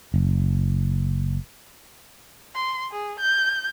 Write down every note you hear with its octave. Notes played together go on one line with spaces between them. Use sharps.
F#1
C6
G#4
G6